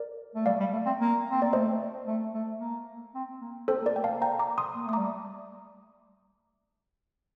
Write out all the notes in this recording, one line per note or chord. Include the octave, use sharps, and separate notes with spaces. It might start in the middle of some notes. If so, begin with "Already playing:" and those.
Already playing: A#4 D5
A3
G3 D5 F5
G3
A3
C4
A#3
C4
A#3 D5
A3 C5 D#5
A3
A3
A#3
C4
A#3
C4 A4 C5
A#3
A#4 D5
A3 G5
A#3 F5 A5
G5 A#5
A#5 D6
C6 D#6
A#3
A3 D#6
G3 A#5 D6